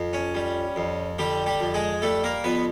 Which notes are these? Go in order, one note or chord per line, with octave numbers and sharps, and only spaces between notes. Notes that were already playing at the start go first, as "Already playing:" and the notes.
Already playing: F2
C#4
G3
F2
D3 G3 G4
G3 G4
F2
G#3 G#4
G3 A3 A4
A#3 A#4
F2 B3 B4